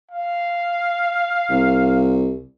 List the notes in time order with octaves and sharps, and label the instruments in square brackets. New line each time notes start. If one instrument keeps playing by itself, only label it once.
[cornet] F5
[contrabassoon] C2